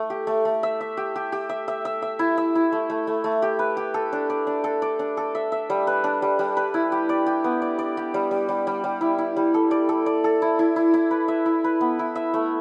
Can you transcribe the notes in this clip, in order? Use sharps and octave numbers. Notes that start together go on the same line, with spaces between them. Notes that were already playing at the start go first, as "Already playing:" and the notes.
Already playing: A3
G4
A3
A3
E5
E5
G4
G4
G4
E5
E5
E5
E5
E4
E5
E4
A3
A3
A3
A3
G4
B4
G4
A4
D4
D5
D4
A4
D5
D4
A4
E5
E5
G3
B4
D4
G3
G3
B4
E4
G4
D5
G4
B3
D5
D5
G4
G3
G3
G3
G3
G3
E4
E4
G3
A4
D5
A4
D5
A4
E4
E4
E4
E4
B4
E5
E4
B4
B3
E4
E5
A3